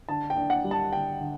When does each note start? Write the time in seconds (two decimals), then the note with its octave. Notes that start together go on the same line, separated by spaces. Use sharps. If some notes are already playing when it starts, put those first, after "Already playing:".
0.09 D3 A5
0.30 G5
0.36 D4
0.50 F#5
0.64 G3
0.71 A5
0.93 D3 G5
1.21 D3